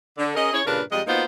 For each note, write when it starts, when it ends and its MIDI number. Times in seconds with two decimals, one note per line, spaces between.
0.18 0.34 50
0.35 0.52 61
0.35 0.52 68
0.35 0.52 70
0.35 0.52 75
0.53 0.61 61
0.53 0.61 64
0.53 0.61 68
0.53 0.61 73
0.65 0.82 43
0.65 0.82 46
0.65 0.82 49
0.65 0.82 62
0.65 0.82 70
0.65 0.82 71
0.92 1.01 41
0.92 1.01 55
0.92 1.01 56
0.92 1.01 75
1.07 1.24 58
1.07 1.24 59
1.07 1.24 63
1.07 1.24 65
1.07 1.24 66
1.07 1.24 72